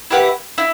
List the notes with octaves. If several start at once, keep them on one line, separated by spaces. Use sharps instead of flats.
E4 G4 B4 F#5
E4